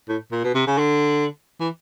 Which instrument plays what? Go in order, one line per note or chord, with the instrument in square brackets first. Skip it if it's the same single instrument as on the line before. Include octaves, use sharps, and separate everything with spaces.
[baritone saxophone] A2
A#2
B2
C3
C#3
D3
E3